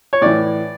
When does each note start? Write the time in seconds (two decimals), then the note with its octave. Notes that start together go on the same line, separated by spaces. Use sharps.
0.13 C#5
0.21 A2 E3 D5